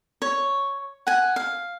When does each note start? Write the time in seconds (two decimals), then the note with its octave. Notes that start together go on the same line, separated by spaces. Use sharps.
0.22 C#5
1.07 F#5 G#5
1.36 F5